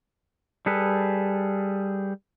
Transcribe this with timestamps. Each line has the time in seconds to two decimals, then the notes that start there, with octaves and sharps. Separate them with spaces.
0.66 G3 G#4 A4 B4